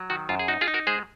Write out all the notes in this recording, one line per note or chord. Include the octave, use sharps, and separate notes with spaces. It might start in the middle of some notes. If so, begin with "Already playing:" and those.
Already playing: F#3
D#3 F#4
F#2 F4
G#4
D#4 F#4
F4 G#4
D#4
F#4 A#4
G#3 G#4 C5